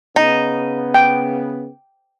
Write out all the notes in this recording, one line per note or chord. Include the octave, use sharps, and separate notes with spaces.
C#3 B3 D#4
G5